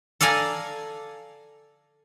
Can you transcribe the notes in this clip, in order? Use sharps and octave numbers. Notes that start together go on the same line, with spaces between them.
A4 D5 F5 G#5 A#5